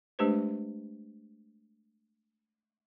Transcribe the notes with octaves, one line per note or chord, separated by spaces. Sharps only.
G#3 A3 D4 G4 B4 C5